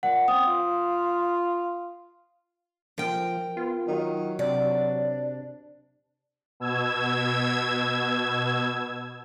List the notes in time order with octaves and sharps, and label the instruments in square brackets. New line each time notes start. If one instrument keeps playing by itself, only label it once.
[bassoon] A#2 [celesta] F#5
[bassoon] C4 [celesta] D#6
[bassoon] F4
[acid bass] F3 [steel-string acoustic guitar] A#4 G5
[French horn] B3 [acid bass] F4
[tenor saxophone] D#3 [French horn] F#3
[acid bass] C3 [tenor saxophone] D4 [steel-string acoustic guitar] D5
[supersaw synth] B2 E6 G#6